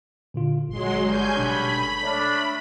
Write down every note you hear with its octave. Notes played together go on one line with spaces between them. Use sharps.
A#2 D3 F4
G1 F#3 G#3 C6
G2 D3 C#4 G#5 G6
G1 B2 D4 B5
A3 D4 C#5 F6